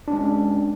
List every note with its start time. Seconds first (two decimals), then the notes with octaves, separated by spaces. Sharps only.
0.08 D4
0.10 C#4
0.13 G#3